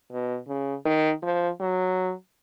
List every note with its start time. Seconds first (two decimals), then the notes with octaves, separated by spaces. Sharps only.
0.12 B2
0.49 C#3
0.85 D#3
1.23 F3
1.60 F#3